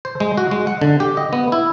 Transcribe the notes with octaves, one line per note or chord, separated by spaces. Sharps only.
C5
G#3
F#4
G#3
F#5
D3
G4
D#5
B3
E4